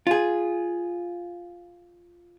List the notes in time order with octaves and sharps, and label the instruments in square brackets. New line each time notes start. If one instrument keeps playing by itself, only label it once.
[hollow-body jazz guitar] F4 G#4